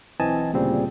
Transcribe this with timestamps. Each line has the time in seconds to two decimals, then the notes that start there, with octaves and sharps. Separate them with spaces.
0.20 B1 E3 C4 D#5 G#5 A5
0.53 D2 A#2 C#3 G3 C4